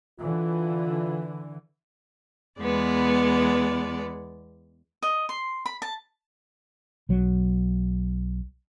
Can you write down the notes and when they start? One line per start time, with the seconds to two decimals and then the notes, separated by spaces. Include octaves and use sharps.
0.20 D3 E3 F4
2.60 E2 G#3 B3 D5
5.03 D#5
5.29 C6
5.66 B5
5.82 A5
7.09 B1 F#3